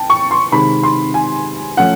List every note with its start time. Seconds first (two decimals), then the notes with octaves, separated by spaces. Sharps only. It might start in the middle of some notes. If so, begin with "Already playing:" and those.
Already playing: G5 A5
0.10 C#6
0.31 C6
0.52 C3 D#3 G#3 C4 B5
0.83 C6
1.14 G#5
1.77 F3 A3 C#4 F#5